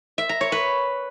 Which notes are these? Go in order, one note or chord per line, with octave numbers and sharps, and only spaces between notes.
E5
A#5
C#5
B4